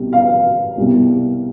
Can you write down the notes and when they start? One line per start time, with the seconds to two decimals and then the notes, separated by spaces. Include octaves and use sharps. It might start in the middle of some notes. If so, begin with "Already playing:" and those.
Already playing: C2 B2 G3
0.13 F5
0.77 C2 B2 G3